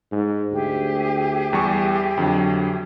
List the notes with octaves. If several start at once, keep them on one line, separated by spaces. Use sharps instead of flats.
G#2
D2 G4 G#4 E5
E2 G3 C#6
F2 D3 F#3